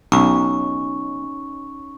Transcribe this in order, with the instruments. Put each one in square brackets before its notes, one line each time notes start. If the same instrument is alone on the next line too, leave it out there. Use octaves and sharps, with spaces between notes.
[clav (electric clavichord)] B1 [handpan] C#4 D#4 [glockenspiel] C#6